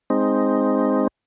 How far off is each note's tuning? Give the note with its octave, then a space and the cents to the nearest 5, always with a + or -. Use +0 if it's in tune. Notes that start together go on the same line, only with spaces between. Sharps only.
G#3 +0 C4 +0 D#4 +0